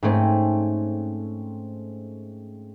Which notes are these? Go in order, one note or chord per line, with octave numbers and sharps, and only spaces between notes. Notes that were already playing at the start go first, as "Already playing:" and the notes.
G#2 A3 C4 C#4